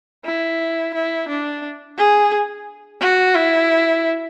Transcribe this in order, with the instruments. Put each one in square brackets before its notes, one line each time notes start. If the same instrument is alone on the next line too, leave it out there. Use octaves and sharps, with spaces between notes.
[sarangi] E4
E4
D4
G#4
F#4
E4